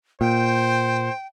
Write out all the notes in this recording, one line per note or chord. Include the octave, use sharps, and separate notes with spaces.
A#2 C5 G5